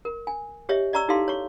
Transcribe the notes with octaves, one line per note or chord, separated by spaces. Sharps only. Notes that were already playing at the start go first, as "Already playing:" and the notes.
A#4
G#5
G4 C#5 D#5 E5
D5 D#5 A#5 C#6 E6
D#4 E4 G4 A4 F5 C6
C#5 C#6